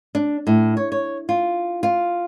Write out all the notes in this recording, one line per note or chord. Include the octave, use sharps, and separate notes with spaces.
D4
A2
C#5
C#5
F4
F4